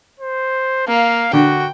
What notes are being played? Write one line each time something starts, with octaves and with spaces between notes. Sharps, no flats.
C5
A#3 F5
D3 F#4 G5